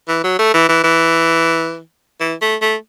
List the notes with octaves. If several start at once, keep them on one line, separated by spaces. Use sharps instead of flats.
E3
F#3
A3
E3
E3
E3
E3
A3
A3